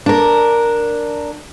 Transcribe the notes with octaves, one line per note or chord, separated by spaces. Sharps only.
D4 A#4